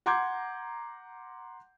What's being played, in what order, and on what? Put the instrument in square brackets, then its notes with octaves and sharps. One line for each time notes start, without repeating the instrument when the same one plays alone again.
[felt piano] F#5 A#5 C6 D6 G6 G#6